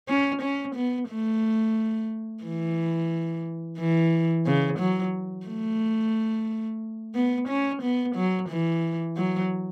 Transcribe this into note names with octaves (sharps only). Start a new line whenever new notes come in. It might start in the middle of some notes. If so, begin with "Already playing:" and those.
C#4
C#4
B3
A3
E3
E3
C#3
F#3
A3
B3
C#4
B3
F#3
E3
F#3